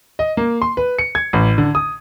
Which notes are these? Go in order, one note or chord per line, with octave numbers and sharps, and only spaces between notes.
D#5
A#3
C6
B4
C#7
G#6
A1
D3
D#6